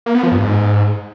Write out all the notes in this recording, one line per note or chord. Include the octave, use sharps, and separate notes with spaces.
A#3
B3
F3
G2
G#2